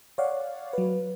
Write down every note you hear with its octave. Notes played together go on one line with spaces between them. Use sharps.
C#5 D5 F5 F#5
F#3 B4